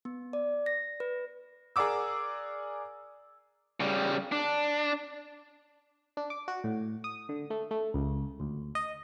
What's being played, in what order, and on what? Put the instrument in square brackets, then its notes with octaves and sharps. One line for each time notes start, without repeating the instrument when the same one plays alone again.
[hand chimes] B3
D5
A#6
B4
[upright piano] G#4 A#4 D5 F#5 D6 E6
[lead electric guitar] C#3 G3
D4
[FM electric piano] D4
D6
F#4
A2
D#6
D3
A3
A3
C#2
D2
D#5